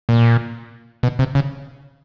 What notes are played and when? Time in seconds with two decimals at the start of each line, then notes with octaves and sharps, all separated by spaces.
0.09 A#2
1.03 B2
1.19 C3
1.35 C#3